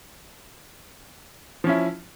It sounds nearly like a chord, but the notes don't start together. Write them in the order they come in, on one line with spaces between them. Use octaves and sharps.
F3 C#4 E4